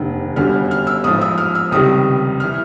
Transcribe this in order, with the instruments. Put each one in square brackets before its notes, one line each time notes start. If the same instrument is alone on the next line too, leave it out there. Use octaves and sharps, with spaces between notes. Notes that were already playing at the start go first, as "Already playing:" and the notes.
Already playing: [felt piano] F1 D#2 D3
G1 F#2 D3 G3 F6
F6
E6
A1 G#2 F3 D#6
E6
F6
E6
C#2 C3 D#3 G3 D#6
E3 F6